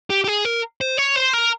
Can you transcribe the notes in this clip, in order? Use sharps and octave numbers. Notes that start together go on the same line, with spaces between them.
G4
G4
G#4
A#4
C5
C#5
C5
A#4